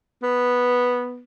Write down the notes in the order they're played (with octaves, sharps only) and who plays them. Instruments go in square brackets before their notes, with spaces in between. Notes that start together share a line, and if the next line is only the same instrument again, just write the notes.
[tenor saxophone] B3